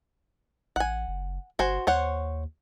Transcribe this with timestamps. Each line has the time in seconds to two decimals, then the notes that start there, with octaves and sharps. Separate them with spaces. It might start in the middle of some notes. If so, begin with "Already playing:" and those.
0.76 A1 F#5 G#5
1.08 F#1
1.59 G1 F#4 C5 G#5
1.87 D#2 C5 C#5 F#5